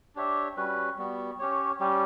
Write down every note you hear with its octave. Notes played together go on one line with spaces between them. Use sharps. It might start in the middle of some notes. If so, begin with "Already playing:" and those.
D4 G4 C#5 E5
G3 C#4 F#4 B4
G3 B3 F#4
C#4 G4 C#5
G3 C#4 G4